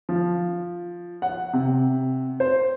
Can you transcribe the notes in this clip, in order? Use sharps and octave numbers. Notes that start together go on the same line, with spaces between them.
F3
F#5
C3
C5